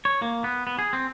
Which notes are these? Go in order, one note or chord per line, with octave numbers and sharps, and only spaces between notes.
C#5
A#3
B3
B3
G#4
C4